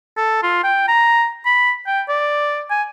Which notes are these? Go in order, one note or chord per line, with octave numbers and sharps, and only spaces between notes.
A4
F4
G5
A#5
B5
G5
D5
G#5